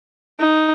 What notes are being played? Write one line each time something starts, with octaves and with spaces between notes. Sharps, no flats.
D#4